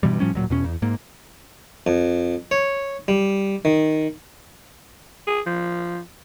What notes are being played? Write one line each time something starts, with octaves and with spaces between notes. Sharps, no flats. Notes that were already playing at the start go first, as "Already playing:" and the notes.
G2 B2 E3 G3
A2 F3 G3 C#4
D1 A#2 F#3
E2 B2 C#4
E2
G#2 A#3
F2
C#5
G3
D#3
G#4
F3